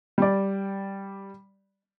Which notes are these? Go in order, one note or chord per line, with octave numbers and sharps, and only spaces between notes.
G3 D5